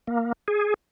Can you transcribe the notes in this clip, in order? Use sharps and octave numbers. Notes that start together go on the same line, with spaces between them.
A#3
G#4